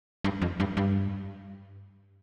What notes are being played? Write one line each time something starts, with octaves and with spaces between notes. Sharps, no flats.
G2
F2
G2
G2